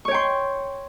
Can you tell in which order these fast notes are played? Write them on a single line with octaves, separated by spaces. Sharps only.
C#6 C#5 G5 C6